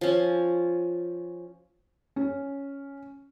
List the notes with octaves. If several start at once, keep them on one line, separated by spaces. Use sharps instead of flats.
F3 C#4
C#4